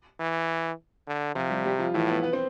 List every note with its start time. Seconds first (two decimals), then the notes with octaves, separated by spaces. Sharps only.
0.20 E3
1.07 D3
1.35 C3 F3 F4
1.50 G3 G4
1.65 G3 G4
1.79 F3 F4
1.94 A2 E3 E4
2.08 B3 B4
2.23 B3 B4
2.32 C4 C5